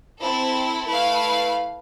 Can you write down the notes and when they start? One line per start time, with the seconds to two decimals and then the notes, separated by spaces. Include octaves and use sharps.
0.20 C4 E4 A4
0.86 A3 E4 B4 F5